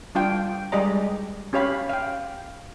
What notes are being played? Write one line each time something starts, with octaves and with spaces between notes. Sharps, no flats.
G3 D4 F4 F5 G5
G3 G#3 G4 D5 D#5 A#5
C#4 G4 C#5 F5 B5
F5 G5